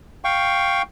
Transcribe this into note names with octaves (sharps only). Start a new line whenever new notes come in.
F5 G5 C#6